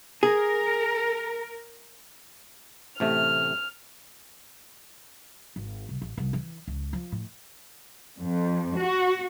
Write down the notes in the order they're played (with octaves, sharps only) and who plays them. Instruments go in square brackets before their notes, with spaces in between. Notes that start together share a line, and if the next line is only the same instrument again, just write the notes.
[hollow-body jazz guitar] G#4 [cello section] A#4
[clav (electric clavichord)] A1 C3 A3 [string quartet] F6
[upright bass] G#1
C2
A1
C2
E3
C#2
F3
A2
[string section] F2
F#4